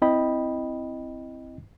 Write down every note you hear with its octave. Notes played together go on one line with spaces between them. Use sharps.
C4 E4 D#5 G5 B5